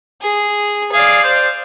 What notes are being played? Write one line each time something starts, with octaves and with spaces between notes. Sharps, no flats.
G#4
G#4 D5 F5
C5